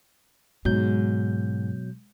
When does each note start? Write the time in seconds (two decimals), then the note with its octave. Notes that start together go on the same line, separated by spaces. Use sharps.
0.65 G#2 B2 F#3 G6